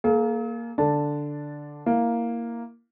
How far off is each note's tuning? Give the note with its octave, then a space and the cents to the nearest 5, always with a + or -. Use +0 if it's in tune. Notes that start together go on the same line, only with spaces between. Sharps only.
A#3 +0 G#4 +45
D3 +0 D4 +0 A5 +0
A#3 +0 E4 +0